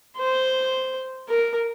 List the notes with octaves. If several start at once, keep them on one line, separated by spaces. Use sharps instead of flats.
C5
A#4